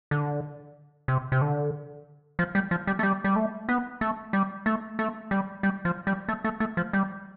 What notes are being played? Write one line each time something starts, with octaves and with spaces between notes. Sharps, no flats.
D3
C3
C3
D3
F3
G3
F3
G3
A3
G3
G3
A3
B3
A3
G3
A3
A3
G3
G3
F3
G3
A3
A3
A3
F3
G3